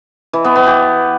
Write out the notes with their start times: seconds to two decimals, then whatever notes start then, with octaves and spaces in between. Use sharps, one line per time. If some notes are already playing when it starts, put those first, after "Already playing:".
0.33 E3
0.44 B3
0.56 B3
0.67 G4